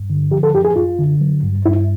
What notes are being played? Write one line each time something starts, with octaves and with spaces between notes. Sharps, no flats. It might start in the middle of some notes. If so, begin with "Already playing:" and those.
Already playing: G2
D3
F3 G4
A4
F#2 G4
G#4
F#2 F4
D3
F#3
G2
G2 E4